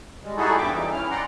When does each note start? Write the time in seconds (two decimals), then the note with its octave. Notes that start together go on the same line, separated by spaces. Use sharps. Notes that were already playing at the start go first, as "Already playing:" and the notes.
0.23 G3 G#3
0.37 G3 D#4 E4 F#4 G#4 A4
0.58 E2 G2 C#3 E5 G5 D6
0.70 E3 F3 G3 D#4
0.92 C#4 E4 F6
1.11 D5 F#5 G5 A#5 C6